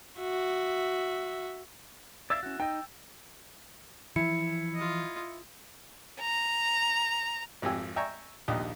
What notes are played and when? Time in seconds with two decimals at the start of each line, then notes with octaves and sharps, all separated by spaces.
0.19 F#4 E5
2.30 D5 E5 F5 E6 A6
2.43 C#4 E4 F#4
2.60 D#4 D#5 G5
4.16 E3 F3 E4 C#7
4.74 F4 D#5
6.20 A#5
7.62 G#1 F2 G4 G#5 E6
7.96 E5 G5 G#5 A#5 C#6
8.48 A#1 D#2 D#4 G4 D#6